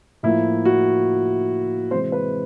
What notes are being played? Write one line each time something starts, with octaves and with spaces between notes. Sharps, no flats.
A2 F3 A#3 E4
F#4
C3 E3 G#3 C5
B4